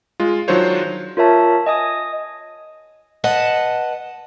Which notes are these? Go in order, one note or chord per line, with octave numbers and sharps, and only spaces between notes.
G#3 F4
D#3 F#3 D4 F4 C5 C#5
F4 A#4 C#5 E5 A5
D#5 G#5 D#6
B4 D#5 F#5 A5